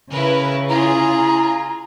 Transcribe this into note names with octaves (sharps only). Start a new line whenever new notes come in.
C#3 E4 A#4 B4
E4 F4 G#4 A#5